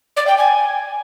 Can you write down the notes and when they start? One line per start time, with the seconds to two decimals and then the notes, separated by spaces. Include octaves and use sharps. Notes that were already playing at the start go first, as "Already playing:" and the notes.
0.16 D5
0.27 G5
0.38 G#5